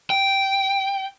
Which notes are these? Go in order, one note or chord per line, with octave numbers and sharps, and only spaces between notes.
G5